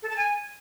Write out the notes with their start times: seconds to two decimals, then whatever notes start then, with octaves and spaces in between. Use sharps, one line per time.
0.02 A4
0.09 A5
0.16 G#5